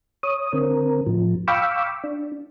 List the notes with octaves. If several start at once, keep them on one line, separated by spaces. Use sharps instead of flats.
C#5 D#6
D3 C4 A#4
A2 F3
F5 G5 B5 C#6 D6 E6
D4